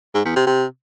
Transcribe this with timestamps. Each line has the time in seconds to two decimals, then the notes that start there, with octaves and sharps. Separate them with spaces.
0.15 G#2
0.25 E2
0.36 C3
0.46 C3